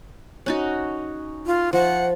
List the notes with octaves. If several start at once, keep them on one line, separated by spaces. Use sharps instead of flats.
C#4 D#4 F#4
F4
F3 F#5